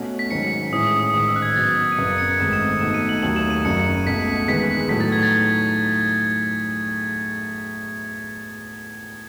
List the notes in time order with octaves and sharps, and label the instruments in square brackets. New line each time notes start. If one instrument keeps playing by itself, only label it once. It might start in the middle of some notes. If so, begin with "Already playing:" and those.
Already playing: [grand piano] B2 A3 C#4 F#4
[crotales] B6
[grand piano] G#2 D#3 F#3 C#4 [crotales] C#7
[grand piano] A2 E3 G#3 C#4 E4 [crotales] D#6
[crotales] D#6
D#6
[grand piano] A1 G#2 D#3 [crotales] D#6
[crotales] E6
F#6
G#6
[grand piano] B2 F#3 B3 [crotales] A6
[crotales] D#7
[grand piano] F#1 F#2 C#3 F#3 B3 [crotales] C#7
[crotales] D#7
C#7
[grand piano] G#1 G#2 D#3 A3 [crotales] E7
[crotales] E7
[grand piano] B2 A3 D#4 [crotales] E7
[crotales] D#7
F#7
[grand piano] D#2 D#3 F#3 A3 [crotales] F#7
[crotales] E7
D#7
[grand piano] F#1 F#2 C#3 F#3 [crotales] C#7
[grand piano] C#2 B2 A3 [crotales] B6
[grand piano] E2 D#3 G#3 B3 [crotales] B6
[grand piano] A2 F#3 A3 D#4 [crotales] B6
[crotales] A6
G#6
A6